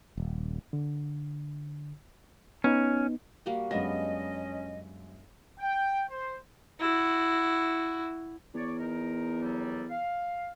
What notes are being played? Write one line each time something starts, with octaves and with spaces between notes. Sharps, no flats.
D#1
D3
B3 C#4 D#4
G3 A#3 F#4
F#2 G#3 B3 C#4 D4 D#5 A#6
G5
C5
E4 F#4
E2 C#5 D5
D#4 A#4
D#2 F#3 G3
F5